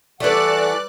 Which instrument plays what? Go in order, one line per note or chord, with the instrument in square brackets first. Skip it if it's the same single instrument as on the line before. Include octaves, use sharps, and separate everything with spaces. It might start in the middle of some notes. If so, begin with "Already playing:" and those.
[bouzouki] E3 A3 [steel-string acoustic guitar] G3 B4 [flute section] A4 F#5 [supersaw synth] D5 F#6